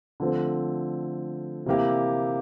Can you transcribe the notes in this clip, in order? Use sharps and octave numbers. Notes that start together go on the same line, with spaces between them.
D3 F3 A3 C4
C3 E3 A#3 E4 G4